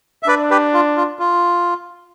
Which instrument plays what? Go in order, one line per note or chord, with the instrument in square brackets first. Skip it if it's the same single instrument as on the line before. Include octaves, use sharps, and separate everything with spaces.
[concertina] E5
[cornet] D4 [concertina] B4 D5
[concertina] G4 B4
F4
F4
F4